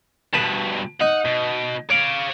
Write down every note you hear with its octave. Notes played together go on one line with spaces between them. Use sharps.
G2 B2 B4 A5
D#4 F#5
B2
C#5 F5 D6